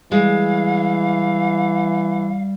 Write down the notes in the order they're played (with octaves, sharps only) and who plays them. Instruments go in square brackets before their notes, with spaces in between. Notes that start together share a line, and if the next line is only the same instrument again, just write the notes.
[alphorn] E3 [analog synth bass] G3 [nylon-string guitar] G#3 [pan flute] F5